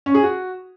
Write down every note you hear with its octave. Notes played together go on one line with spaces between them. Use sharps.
C#4
G#4
F#4